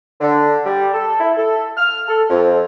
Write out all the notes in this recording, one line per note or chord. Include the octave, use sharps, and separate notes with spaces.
D3
G3
A4
E4
A4
F6
A4
F2